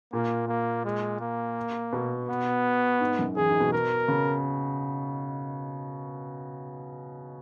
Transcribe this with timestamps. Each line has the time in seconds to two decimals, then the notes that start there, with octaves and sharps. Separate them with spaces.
0.13 A#2 A#3
0.48 A#3
0.85 G#3
1.21 A#3
1.93 B2
2.28 B3
3.01 G#2
3.19 F#2
3.36 E2 G#4
3.49 G#2
3.60 B2
3.73 A#4
4.08 C#3